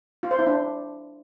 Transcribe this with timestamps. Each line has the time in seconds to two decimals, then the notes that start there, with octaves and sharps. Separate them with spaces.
0.23 F4
0.31 C5
0.39 E4
0.47 D4